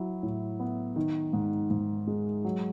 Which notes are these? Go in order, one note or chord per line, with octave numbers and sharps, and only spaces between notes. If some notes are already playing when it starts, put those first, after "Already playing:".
Already playing: F#3 E4
A2
B3
D#3
G#2
G#2
G#3
F#3